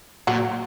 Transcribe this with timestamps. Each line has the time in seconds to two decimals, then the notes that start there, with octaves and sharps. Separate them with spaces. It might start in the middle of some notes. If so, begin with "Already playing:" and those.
0.27 A#2 F#3 F#4